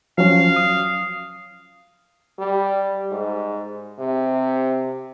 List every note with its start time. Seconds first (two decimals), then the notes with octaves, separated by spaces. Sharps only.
0.18 F3 F#3 C#4 F5
0.56 D#6
2.39 G3
3.12 G#2
3.99 C3